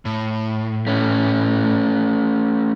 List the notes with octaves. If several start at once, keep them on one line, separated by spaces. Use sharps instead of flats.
A2
A3 C#4